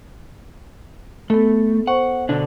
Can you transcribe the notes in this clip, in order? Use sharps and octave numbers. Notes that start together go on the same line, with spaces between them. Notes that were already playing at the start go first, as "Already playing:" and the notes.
A3 B3 A4
C5 F#5 C#6
B2 D3 D4